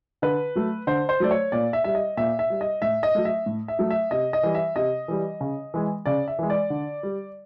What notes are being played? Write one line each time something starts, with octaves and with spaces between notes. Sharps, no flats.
D3 B4
F#3 A3
D3 C5
C5
F#3 A3 D5
C#5
A#2 D5
E5
G3 E5
D#5
A#2 E5
E5
G3
D#5
A2 E5
D#5
F#3 A3
E5
A2
E5
F#3 A3
E5
C3 D#5
D#5
E3 G3
E5
C3 D#5
E3 G3
C#3
E3 G#3
C#3 D5
E5
E3 G#3
D5
D3
G3